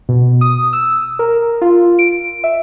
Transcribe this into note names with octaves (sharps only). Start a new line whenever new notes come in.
B2
D#6
E6
A#4
F4
D7
E5